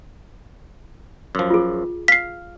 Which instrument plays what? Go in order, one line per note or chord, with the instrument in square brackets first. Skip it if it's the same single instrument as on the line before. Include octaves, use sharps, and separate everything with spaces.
[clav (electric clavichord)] F#2 F3
[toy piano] F4 G#4
[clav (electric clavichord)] F5 [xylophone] B6 C7